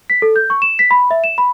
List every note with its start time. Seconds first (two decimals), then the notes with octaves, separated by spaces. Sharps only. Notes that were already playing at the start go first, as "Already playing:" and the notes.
0.10 B6
0.22 A4
0.36 G6
0.50 C#6
0.62 E7
0.79 B6
0.91 B5
1.11 E5
1.24 E7
1.38 B5